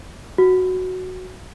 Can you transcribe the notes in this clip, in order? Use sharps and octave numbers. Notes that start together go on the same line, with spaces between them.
F#4